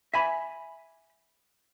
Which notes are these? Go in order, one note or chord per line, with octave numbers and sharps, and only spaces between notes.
E5 G#5 B5